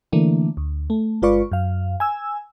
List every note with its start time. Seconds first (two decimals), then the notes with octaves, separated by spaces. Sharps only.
0.12 D3 E3 A3 A#3 D4
0.57 D2
0.90 A3
1.22 G1 G#3 F4 B4 D5 C#6
1.52 F#2 F5
2.00 G#5 E6